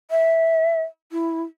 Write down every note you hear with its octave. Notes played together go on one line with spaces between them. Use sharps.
E5
E4